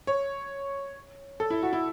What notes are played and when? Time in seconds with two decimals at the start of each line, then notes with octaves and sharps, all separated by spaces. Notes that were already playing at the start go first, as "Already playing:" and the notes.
0.07 C#5
1.40 A4
1.50 E4
1.63 F#4
1.73 E4